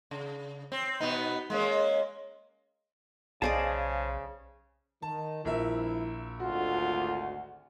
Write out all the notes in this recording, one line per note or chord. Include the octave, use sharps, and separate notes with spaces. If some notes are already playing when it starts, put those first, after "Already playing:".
C#3
C4
B2 B3 D#4
G#3 A#3 C#4
B1 C#3 G#4 C5 D5 D#5 F5 A5
D#3 A5
A#1 G2 F3 E4 A#4 E5
G#1 D2 F4 F#4